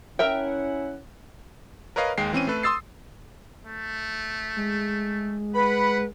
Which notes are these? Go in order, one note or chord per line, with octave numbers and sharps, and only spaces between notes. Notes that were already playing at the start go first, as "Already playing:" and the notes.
C#4 E4 A#4 E5 F#5 G5
A#4 B4 C#5 D#5 F5
D#2 G#3 G5 C7
E3 C4 C#4 D#7
A3 A4 B4
C6 D#6 E6 A6 C7
A3
G#3
B4 F#5 B5